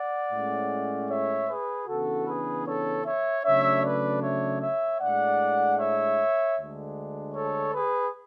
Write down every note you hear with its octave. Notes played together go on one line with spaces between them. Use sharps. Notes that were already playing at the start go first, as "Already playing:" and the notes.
Already playing: D5 F#5
A2 G#3 C#4
C#5 E5
G#4 B4
C#3 E3 B3 D4 F#4 A4
G#4 B4
A4 C#5
C#5 E5
C#3 F#3 A3 D4 C#5 E5
B4 D5
C#5 E5
C#5 E5
A2 G#3 D4 D5 F#5
C#5 E5
D2 D3 G#3 D4
A4 C#5
G#4 B4